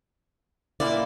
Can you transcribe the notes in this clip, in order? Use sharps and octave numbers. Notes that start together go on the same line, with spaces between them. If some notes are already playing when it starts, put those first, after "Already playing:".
A#2 A#3 E4 D5